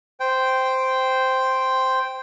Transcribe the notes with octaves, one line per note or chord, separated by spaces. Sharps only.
C5 G5